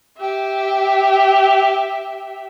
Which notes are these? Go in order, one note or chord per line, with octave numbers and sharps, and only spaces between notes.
G4 E5